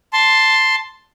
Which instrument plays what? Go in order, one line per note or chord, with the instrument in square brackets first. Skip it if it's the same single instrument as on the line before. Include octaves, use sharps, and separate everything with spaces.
[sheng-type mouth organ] A5 C6